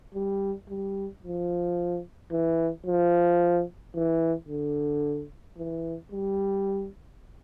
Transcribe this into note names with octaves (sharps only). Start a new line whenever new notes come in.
G3
G3
F3
E3
F3
E3
D3
E3
G3